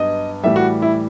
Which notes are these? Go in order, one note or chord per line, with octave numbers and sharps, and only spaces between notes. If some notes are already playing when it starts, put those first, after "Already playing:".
Already playing: G2 F#3 B3 D#5
A2 E3 G3 E5
F#4
E4